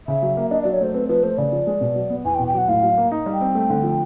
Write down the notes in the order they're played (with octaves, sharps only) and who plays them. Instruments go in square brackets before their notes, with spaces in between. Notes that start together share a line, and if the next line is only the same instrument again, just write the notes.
[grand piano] C#3 [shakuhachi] E5
[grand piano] F#3
A#3
[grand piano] D4 [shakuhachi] D#5
[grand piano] F#3 [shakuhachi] D5
[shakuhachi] C#5
[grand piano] A3 [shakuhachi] C5
[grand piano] C4 [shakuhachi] B4
[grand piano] F3 [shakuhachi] B4
[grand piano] A3 [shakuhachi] C5
[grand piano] C#3 [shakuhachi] D5
[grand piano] F3
G#3
B2
F#3
B3
[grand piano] E2 [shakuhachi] G#5
[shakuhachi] G5
[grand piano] B2
[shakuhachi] G5
[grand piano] F#3 [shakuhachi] F#5
[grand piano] A2 [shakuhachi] F5
[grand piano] F#3
A#3
D#4
G3
[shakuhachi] G5
[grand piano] C4
A3
D3
F3